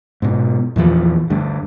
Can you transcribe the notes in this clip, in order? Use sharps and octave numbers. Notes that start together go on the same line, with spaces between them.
G#2 B2
E2 A#2 E3 F3
D2 G2